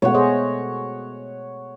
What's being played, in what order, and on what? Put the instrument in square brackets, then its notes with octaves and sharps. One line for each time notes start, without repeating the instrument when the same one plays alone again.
[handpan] B2 G#3 A3 [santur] C#5 F#5
[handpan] G#4 C5 D#5